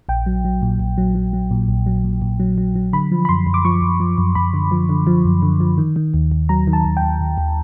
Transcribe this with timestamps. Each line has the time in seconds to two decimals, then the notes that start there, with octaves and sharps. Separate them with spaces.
0.09 A#1 G5
0.26 F#3
0.45 F#3
0.62 A#2
0.80 A#1
0.98 F#3
1.15 F#3
1.33 F#3
1.51 A#2
1.68 A#1
1.86 F#3
2.04 A#2
2.22 A#2
2.40 F#3
2.58 F#3
2.75 F#3
2.93 D3 B5
3.12 F3
3.25 B5
3.29 F#2 C6
3.47 F#2
3.54 D6
3.65 F3 C#6
3.82 F#2
4.00 F3
4.18 F#2
4.35 F#2 B5
4.54 D3
4.71 F3
4.89 D3
5.07 F3
5.25 F#2
5.42 D3
5.60 F3
5.78 D#3
5.96 D#3
6.14 D#2
6.32 D#2
6.49 F#3 A#5
6.67 D#3
6.73 A5
6.85 D#2
6.97 G5
7.02 D#2
7.21 D#2
7.38 D#2